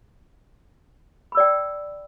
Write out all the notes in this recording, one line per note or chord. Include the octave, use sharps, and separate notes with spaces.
D5 G5 B5 E6